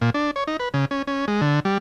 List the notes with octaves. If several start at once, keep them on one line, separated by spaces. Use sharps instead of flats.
A#2
D4
C#5
D#4
B4
C#3
C#4
C#4
G#3
D3
G3